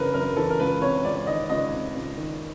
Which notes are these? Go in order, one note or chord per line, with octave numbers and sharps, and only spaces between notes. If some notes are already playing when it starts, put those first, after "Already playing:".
Already playing: F#2 C#3 E3 A#4 B4
F#2 A#4
E3 A4
A#4
C#2 B4
C3 C#5
C#2 D5
D#3 D#5
C#2 D#5
C3
C#2
D#3